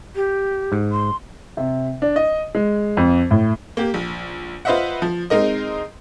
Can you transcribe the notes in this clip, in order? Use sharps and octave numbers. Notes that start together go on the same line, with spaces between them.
G4
G#2
C6
C3
D4
D#5
G#3
F2
A2
A#3 G4
A#1
F4 B4 C5 D#5 E5 F#5
F3
G#3 C4 D#4 A#4 D#5